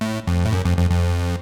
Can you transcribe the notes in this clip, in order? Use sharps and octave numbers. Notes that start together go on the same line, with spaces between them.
A2
F2
A2
F#2
F2
F2
F2